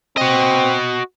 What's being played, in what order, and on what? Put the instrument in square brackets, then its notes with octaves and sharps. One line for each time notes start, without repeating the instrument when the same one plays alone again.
[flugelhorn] C4 [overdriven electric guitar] F#4 D#5